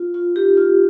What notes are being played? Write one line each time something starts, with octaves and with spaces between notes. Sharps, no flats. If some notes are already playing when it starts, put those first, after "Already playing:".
Already playing: F4
F4
D#4 G4
F4